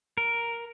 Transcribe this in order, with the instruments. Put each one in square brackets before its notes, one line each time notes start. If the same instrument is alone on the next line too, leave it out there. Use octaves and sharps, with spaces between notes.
[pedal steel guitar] A#4